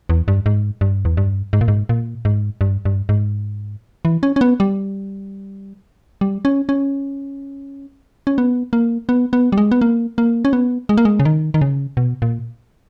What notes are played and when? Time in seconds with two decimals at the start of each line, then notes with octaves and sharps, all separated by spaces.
0.09 E2
0.28 G2
0.46 G#2
0.81 G2
1.05 E2
1.17 G2
1.53 G#2
1.61 A#2
1.68 G#2
1.89 A#2
2.25 G#2
2.61 G2
2.85 G2
3.09 G#2
4.05 E3
4.23 C#4
4.36 C#4
4.41 B3
4.60 G3
6.21 G3
6.45 C#4
6.69 C#4
8.27 C#4
8.38 B3
8.73 A#3
9.09 B3
9.33 B3
9.52 G3
9.58 G#3
9.72 B3
9.81 A#3
10.18 A#3
10.45 C#4
10.53 B3
10.89 G#3
10.97 A#3
11.05 G#3
11.20 C#3
11.25 D#3
11.54 D#3
11.61 C#3
11.97 B2
12.22 A#2